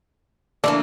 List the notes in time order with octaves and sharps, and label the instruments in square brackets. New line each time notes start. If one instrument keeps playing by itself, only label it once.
[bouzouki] E3 A3 A#3 [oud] D4 [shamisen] D5